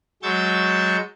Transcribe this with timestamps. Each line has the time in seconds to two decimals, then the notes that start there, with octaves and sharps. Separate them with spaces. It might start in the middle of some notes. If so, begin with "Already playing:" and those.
0.23 F#3 G#3 C#6 E6 G6 A6